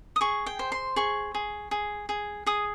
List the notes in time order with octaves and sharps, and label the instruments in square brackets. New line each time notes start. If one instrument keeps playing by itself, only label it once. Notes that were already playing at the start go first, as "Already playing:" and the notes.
[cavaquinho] D#6
G#4 C#6
G5
C5
C6
G#4 C#6
G#4
G#4
G#4
G#4 D#6